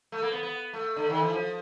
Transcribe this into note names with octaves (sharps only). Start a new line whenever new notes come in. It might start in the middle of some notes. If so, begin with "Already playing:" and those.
A3
A#3
B3
B3
A3
D3
D#3
E3
F3